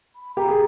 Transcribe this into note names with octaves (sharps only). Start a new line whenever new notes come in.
B5
G4 A#5
G#4